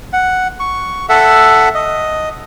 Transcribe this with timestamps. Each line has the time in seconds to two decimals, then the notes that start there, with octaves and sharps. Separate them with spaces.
0.13 F#5
0.60 C#6
1.09 A4 E5 F#5
1.75 D#5